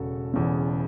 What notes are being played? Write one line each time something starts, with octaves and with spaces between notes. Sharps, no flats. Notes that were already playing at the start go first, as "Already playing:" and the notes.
Already playing: E1 E2 C#3 F#4 A4
E1 E2 C#3